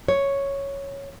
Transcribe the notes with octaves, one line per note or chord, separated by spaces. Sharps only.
C#5